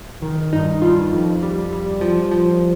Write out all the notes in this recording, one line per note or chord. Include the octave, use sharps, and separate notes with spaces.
D#3
G2 D#4
G2 F4
F2
G3
G3
F3
F3